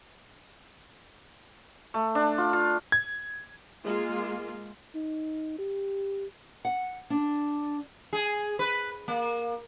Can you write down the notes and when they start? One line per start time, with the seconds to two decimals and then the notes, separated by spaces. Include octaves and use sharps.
1.94 A3
2.15 D4
2.38 F4
2.53 F4
2.92 G#6
3.84 G#3 A#3 F4
4.95 D#4
5.58 G4
6.65 F#5
7.10 D4
8.13 G#4
8.59 B4
9.08 A#3